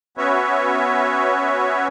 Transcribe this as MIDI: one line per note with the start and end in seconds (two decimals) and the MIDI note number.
0.18 1.88 59
0.18 1.88 61
0.18 1.88 66
0.18 1.88 71
0.18 1.88 73
0.18 1.88 76